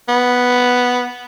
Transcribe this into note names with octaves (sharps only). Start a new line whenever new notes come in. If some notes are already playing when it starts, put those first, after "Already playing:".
B3